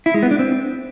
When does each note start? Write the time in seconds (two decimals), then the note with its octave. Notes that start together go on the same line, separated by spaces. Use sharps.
0.06 E4
0.14 G#3
0.23 B3
0.31 D4
0.39 C4